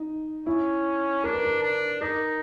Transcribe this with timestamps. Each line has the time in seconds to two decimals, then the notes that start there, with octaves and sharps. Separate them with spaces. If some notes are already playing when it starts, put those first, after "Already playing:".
Already playing: D#4
0.46 C#4 E4
1.24 D4 A#4
1.33 B4
1.45 A#4
1.62 D4
2.01 D#4 A#4